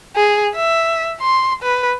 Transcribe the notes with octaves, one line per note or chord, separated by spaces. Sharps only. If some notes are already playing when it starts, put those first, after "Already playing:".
G#4
E5
C6
B4